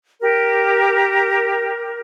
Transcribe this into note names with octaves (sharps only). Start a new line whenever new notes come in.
G4 A#4